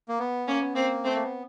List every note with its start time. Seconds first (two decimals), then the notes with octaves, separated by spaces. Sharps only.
0.08 A#3
0.19 B3
0.47 A#3 C#4
0.60 B3
0.74 A#3 C4
1.04 A3 C4
1.15 A#3
1.23 B3